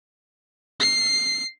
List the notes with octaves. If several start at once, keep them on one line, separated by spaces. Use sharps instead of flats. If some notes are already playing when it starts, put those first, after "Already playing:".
C7